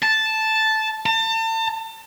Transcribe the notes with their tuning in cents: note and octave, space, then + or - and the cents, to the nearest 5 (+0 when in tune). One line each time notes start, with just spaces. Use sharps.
A5 -5
A5 +35